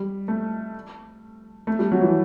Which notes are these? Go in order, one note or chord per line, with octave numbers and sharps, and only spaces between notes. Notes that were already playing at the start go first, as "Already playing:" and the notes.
Already playing: G3
A3
A3
G3
F#3
E3